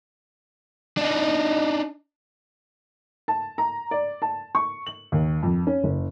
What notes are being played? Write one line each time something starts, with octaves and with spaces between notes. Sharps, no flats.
D4 D#4
A5
A#5
D5
A5
C#6
F#7
D#2
F2
C#4
F#1